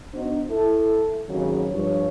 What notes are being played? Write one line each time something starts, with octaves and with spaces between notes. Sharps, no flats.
B3 D4 D#4 F#4 C5
E4 A4
G#1 D#2 C#3 F#3
G2 F3 C#5